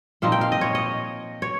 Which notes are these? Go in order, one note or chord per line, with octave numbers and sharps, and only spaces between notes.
A#2 F3 C4 D#4 F5
G5
F5
D#5
C#5
D#5
C#5